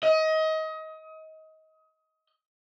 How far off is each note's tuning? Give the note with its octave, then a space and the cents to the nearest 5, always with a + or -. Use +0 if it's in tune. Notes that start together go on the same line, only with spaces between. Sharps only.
D#5 +25